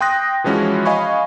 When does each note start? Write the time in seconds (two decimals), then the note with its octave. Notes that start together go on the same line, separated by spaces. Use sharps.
0.01 G5 C6 D#6 F#6 A#6
0.44 E3 F3 G#3 C#4 E4 F#4
0.86 D#5 F5 G#5 B5 C#6